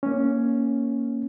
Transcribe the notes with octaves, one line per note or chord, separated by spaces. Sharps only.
A#3 C#4